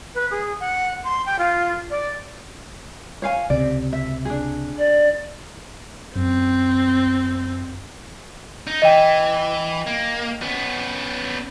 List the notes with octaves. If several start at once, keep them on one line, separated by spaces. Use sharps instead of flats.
B4
G#4
F#5
C6
G5
F4
D5
C#5 F5 G#5
C#2 C3 D5
E5
D4 G#4
D5
F#2 C4
D#4
E3 D#5 G5
A#3
B3 C#4